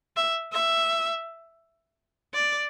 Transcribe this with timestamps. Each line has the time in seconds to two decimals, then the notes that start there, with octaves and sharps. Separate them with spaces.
0.16 E5
0.53 E5
2.34 D5